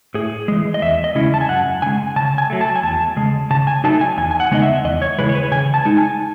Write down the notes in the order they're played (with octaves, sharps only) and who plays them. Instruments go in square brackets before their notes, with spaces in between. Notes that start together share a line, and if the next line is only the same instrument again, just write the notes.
[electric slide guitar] A2 G#4
E3 G#3
D#5
E2 E5
D#5
C#3 G#3 C#4 E4
A5
G#5
F#2 F#5
C#3 G#3 G#5
C#3 A5
G#5
F#3 A3
A5
G#5
E2 A5
C#3 G#3
C#3 A5
G#5
F#3 A3 D#4 A5
G#5
E2 G#5
G#5
F#5
C#3 G#3 B3 D#4 D#5
E5
E2 D#5
C#5
C#3 E3 G#3 B4
C#5
B4
C#3 G#5
A5
G#3 D#4
G#5